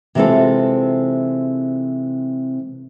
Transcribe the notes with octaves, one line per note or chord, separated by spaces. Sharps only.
C3 E3 G#3 C4 F4 A4